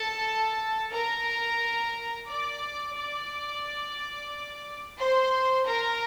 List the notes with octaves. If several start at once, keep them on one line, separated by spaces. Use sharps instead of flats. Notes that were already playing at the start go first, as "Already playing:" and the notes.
Already playing: A4 A5
A#4 A#5
D5 D6
D5 D6
C5 C6
A#4 A#5